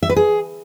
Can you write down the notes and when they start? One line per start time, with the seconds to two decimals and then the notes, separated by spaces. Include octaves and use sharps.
0.03 E5
0.09 B4
0.16 G#4